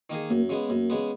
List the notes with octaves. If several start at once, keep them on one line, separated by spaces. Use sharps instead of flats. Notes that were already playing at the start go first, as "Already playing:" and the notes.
D#3 A#3 D#4 G#4
F#2 A#3
C#3 G#3 B3
F#2 A#3
C#3 G#3 B3